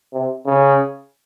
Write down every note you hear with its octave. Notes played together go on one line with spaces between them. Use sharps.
C3
C#3